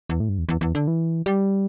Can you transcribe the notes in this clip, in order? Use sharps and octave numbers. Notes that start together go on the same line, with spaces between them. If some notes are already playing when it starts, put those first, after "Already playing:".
E2
A2
G2
E2
E2
E2
D3
E3
G3